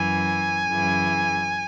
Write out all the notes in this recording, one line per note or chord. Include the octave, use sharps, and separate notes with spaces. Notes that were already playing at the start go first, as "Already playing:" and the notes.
Already playing: F#2 E3 G#5
F#2 C#3 E3